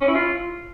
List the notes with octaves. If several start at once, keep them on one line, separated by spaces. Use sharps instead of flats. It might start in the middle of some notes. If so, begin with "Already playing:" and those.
C#4
E4
F4